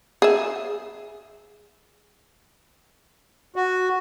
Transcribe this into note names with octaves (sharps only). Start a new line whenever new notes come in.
G#4 E5
F#4